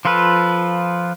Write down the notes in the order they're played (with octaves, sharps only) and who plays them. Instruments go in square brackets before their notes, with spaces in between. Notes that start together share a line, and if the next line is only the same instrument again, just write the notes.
[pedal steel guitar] F3 F4 A4 B4